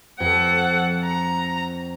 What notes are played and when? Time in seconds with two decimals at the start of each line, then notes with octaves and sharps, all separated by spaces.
0.20 F2 A4 F#5
1.05 A#5